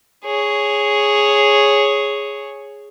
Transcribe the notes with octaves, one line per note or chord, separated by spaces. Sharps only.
G#4 C#5